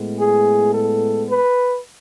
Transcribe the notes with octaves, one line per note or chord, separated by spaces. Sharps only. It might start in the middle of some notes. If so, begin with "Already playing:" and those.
Already playing: A2 G#3 B3
G#4
A4
B4